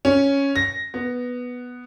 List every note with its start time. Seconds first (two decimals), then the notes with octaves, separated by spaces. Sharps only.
0.05 C#4
0.56 A#6
0.94 B3